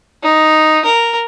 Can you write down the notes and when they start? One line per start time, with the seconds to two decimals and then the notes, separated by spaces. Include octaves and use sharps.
0.23 D#4
0.85 A#4